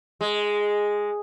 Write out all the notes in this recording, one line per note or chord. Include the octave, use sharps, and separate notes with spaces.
G#3